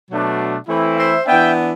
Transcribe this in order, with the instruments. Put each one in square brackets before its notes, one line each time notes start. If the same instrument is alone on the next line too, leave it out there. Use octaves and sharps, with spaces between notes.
[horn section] B2 F#3 A3 D4
E3 A3 C4 E4
C5 E5
E3 B3 D4 E5 G5